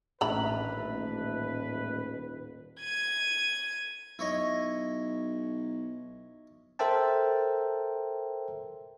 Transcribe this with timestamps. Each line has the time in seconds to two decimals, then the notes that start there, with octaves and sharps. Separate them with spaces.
0.21 D#1 A1 D4 B4 E5 A#5 B5
2.81 G#6 D#7
4.19 B1 E4 C#5 D#5
6.79 A4 A#4 C5 E5 G5 A5